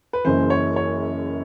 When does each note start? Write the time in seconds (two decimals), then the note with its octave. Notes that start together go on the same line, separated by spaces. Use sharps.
0.13 B4
0.25 F#1 F#2 C#3 E3 C5
0.50 C#5
0.76 C#5